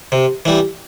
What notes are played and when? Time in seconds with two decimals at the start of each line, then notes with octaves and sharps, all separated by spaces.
0.12 C3
0.45 E3 G3